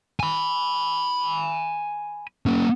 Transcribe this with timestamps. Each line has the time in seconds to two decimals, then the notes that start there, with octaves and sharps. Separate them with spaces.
0.20 G#5 B5
2.46 A#3 C#4